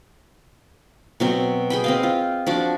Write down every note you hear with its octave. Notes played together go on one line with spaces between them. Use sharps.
B2 F#3 C4
G#4 G5 B5
C4 D#5 F5
F4
F3 D4 F#4